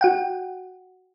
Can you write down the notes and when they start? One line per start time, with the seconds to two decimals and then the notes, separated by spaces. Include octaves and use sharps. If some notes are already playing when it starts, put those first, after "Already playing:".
0.01 F#4 F#5 G5